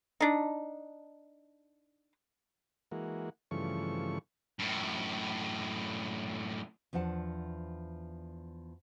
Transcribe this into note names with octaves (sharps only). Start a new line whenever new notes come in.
D4 D#4
E3 G#3 A#3 F#4
G2 C#3 E3 F3 A3 C#6
F#2 A2
E2 F3 D4 F#5 A5